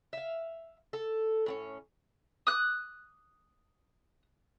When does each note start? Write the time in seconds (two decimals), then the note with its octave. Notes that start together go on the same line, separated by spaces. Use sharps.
0.13 E5 F5
0.93 A4
1.46 A2 C4 C#4
2.47 D#6 F#6